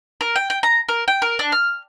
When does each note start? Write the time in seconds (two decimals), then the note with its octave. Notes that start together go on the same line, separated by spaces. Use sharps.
0.21 A#4
0.36 G5
0.50 G5
0.63 A#5
0.89 A#4
1.08 G5
1.22 A#4
1.39 D4
1.52 F6